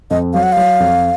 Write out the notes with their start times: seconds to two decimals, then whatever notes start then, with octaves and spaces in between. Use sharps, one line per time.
0.11 F2 D#5
0.34 F#3 F5
0.43 F#5
0.52 F#3 F5
0.80 F2